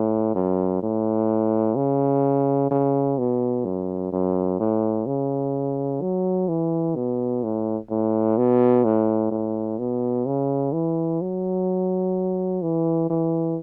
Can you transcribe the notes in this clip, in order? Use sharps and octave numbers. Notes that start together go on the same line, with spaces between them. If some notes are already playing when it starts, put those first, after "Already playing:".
Already playing: A2
F#2
A2
C#3
C#3
B2
F#2
F#2
A2
C#3
F#3
E3
B2
A2
A2
B2
A2
A2
B2
C#3
E3
F#3
E3
E3